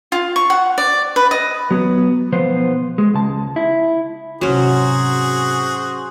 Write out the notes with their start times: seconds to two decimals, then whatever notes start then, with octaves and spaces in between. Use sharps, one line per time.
0.12 F4
0.36 C#6
0.50 F#5
0.78 D5
1.16 B4
1.31 D#5
1.71 F#3 B3
2.32 B1 F3 B3 C5
2.98 G#3
3.14 C#2 A5
3.56 E4
4.41 G#2 C3 F#3 C#4 F#4 G#4 C5